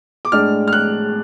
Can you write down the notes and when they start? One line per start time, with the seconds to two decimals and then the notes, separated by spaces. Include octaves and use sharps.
0.25 D6
0.32 A2 G#3 D4 F6
0.68 F6
0.73 F#6